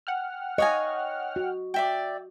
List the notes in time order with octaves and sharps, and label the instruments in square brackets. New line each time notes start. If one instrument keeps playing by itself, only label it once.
[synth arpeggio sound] F#5 G5 F6
[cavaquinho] C#5 F5 G#5 [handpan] D#5
[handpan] F#4
[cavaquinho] D5 E5 G5